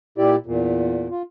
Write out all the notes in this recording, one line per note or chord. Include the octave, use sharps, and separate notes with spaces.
A#2 E4 G4 D5
E2 A#2
F4